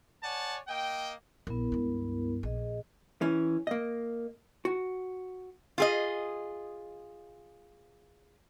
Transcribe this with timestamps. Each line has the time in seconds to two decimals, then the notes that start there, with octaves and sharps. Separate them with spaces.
0.23 C#5 D5 F#5 G#5 A5
0.68 A#3 D#5 G5
1.47 A#1 B3 E4 A#4
1.72 C#2 G2
2.43 A#1 G#4 D#5
3.21 E3 C#4
3.67 A#3 D#5
4.65 F#4
5.78 F4 G#4 D#5